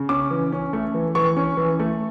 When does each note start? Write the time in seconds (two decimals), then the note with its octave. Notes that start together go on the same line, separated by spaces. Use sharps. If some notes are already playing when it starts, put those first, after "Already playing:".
Already playing: C#3
0.09 C#4 D6
0.31 E3
0.52 C#4
0.73 A3
0.94 E3
1.15 E3 C#6
1.36 C#4
1.57 E3
1.80 A3